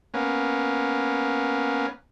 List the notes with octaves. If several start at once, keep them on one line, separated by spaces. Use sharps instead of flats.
A#3 B3 C#4